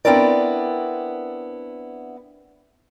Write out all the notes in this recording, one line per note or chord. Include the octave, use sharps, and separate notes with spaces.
B3 C4 D4 E4 A#4 D5